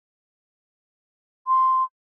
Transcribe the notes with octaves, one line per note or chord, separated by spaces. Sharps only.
C6